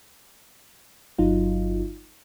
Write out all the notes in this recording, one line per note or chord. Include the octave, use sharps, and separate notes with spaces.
G1 F#3 D#4 F4